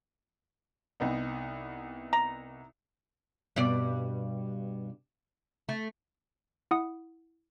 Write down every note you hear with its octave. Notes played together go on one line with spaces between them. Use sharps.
C2 B3 D#4
A#5
G2 B2 D5
A3
E4 F#5 D#6